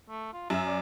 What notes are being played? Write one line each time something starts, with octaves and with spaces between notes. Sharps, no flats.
A3
F4
F#2 E5
D5